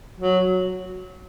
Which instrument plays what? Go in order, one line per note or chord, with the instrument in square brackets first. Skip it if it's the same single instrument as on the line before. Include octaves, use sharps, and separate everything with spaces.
[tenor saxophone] F#3